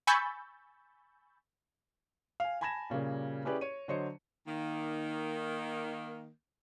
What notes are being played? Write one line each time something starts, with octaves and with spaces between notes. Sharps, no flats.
G#5 B5 C#6 E6 G6 A6
F5 G#5
G#5 A5 B5 G#6 A#6 E7
A#2 C#3 G3 A#3
C#4 E4 G4 G#4 B4 D5
C#5 D#7
D3 F#3 C5 C#5 D#5 C#7
D#3 A#3